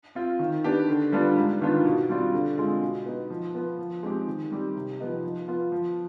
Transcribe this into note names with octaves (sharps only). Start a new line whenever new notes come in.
C4 F4
D#3
B3 D4 G4
D3
G3 B3 D4 F4
G#2
D#3 B3 D4 F4
B2
G3 C4 F4
D3
G#3 C4 F4
B2
B3 D#4
F3
B3 F4
F3
G#3 C4 D#4 G4
D#3
G3 C4 G4
C3
F3 B3 D#4
F3
B3 F4
F3